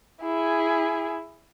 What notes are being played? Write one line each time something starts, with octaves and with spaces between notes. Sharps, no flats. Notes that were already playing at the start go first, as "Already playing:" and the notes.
E4 G#4